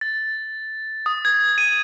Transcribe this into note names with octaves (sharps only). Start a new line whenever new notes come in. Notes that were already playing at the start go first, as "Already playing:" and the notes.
A6
D#6
G#6
D#7